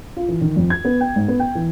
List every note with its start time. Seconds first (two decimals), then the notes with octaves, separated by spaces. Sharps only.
0.17 F4
0.28 E3
0.41 D#3
0.56 F2
0.70 G#6
0.85 B3
1.01 G5
1.16 G#2
1.28 B3
1.40 G5
1.55 E3